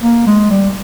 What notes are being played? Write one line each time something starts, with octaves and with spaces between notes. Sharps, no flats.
A#3
G#3
G3